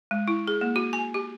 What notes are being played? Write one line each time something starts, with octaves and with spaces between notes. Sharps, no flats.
G#3
E4
G#4
A#3
F#4
G#5
G4